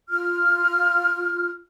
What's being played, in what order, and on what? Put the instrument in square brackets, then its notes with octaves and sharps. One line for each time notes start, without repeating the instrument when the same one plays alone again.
[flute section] F4 F6